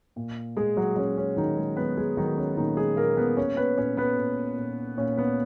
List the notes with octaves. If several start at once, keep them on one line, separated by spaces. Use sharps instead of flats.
A#2
A#2 G#3 G#4
F#3 F#4
F#3 C#4
C#4
D#3 F#3 D#4
G#3 G#4
F#3 B3 B4
G#3 G#4
D#3 F#3 D#4
C#4
A#2 D#3 D#4
G#3 G#4
A#2 A#3 A#4
B3 B4
A#2 C#4 C#5
B3 B4
A#2 C#4 C#5
B3 B4
A#2
A#2
A#2 C#4 C#5
B3 B4